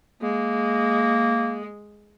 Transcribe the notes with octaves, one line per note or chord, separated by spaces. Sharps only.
G#3 A#3